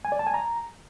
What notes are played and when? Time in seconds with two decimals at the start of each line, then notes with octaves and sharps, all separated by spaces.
0.05 G#5
0.12 D5
0.19 A5
0.27 G#5
0.34 A#5